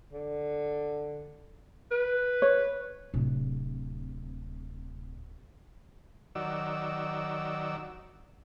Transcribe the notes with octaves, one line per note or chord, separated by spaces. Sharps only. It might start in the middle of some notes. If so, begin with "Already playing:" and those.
D3
B4
C#5
D1 C3
D#3 F#3 D5 E6